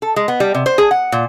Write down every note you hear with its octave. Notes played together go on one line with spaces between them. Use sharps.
A4
G#3
B3
G3
C3
C5
G#4
F#5
A#2